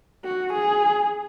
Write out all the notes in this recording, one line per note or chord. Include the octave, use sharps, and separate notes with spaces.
F#4
G#4